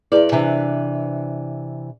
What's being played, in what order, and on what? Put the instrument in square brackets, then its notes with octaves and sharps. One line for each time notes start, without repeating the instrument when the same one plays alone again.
[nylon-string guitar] E2 A#2 D5 [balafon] E4 G#4 B4
[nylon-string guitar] C3 E3 D4 [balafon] G#5